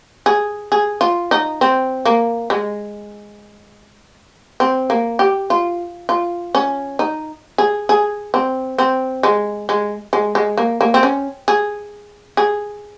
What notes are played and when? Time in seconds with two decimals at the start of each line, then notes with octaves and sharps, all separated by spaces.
0.26 G#4
0.72 G#4
1.01 F4
1.31 D#4
1.61 C4
2.05 A#3
2.50 G#3
4.60 C4
4.90 A#3
5.19 G4
5.50 F4
6.09 F4
6.55 C#4
6.99 D#4
7.58 G#4
7.89 G#4
8.34 C4
8.78 C4
9.23 G#3
9.69 G#3
10.13 G#3
10.35 G#3
10.58 A#3
10.81 A#3
10.94 C4
11.03 C#4
11.48 G#4
12.37 G#4